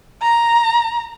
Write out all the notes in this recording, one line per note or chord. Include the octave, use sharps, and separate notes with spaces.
A#5